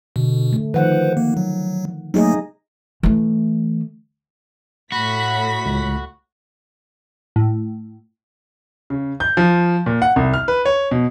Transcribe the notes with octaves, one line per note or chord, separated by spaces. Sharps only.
B2 D3
A3
D#3 F3 B4 C5 F#5
A#3
F#3
F#3 A3 A#3 D#4 G#4 D#5
E3 A3
A2 F#4 B5 B6
C#2
A2
C#3
G6
F3
A#2
F#5
C2
F6
B4
C#5
B2